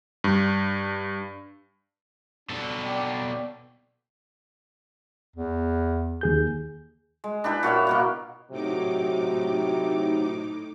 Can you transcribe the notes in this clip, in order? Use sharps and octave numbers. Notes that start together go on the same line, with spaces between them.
G2
B2 D4 A4
D5 G5
E2
D#2 G#4 G6
G#3
D4 E4 G4 B4
A#2 F#4 C#5 E5
B2 A#3 F#5
A2 C3 F#3 D#4 D6